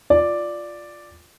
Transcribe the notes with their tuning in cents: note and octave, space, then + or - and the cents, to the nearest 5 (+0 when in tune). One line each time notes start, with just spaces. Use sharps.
F4 +0 D5 +0